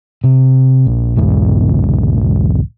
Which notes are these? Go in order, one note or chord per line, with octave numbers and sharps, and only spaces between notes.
C3
A#1
B1 E2 G#2 C#3